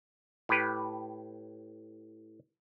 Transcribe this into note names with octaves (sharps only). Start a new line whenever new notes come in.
A2 G4 B4